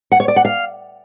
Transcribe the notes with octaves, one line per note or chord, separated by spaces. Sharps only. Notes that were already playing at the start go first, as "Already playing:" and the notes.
F#5
C#5
D5
F#5
F5